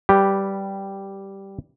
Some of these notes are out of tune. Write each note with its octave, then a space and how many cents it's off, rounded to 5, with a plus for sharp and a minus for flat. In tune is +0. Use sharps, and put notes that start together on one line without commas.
G3 -5 G4 +0 B4 +0